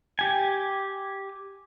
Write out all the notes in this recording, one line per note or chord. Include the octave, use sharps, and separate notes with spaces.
G4 G#5